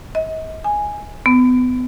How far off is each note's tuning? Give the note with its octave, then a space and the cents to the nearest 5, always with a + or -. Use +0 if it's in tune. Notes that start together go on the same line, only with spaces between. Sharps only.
D#5 +40
G#5 +0
B3 +30